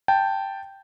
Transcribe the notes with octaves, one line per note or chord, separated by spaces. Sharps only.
G5 A5